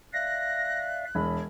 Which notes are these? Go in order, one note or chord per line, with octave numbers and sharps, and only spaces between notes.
D5 E5 F5 F#6 A#6
E1 C#5 B5